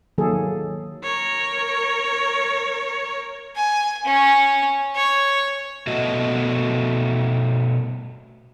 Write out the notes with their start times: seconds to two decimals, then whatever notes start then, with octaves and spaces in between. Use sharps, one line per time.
0.18 D#3 F#3 A#3 G#4 A4
1.04 A#4 C#5
3.56 G#5
4.04 C#4
4.96 C#5
5.87 B2 A3 F#4 D#5